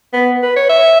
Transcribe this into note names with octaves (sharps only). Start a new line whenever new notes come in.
B3
B4
C#5
E5